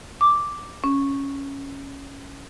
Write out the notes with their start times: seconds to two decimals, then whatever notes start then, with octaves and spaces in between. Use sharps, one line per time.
0.21 D6
0.84 C#4